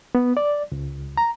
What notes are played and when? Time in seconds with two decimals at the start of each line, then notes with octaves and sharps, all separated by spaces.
0.15 B3
0.37 D5
0.72 C#2
1.17 A#5